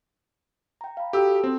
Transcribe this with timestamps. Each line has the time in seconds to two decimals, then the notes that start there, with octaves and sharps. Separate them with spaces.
0.81 G5 A#5
0.97 F5 B5
1.13 F#4 G4 A4 E6
1.29 A4
1.44 C4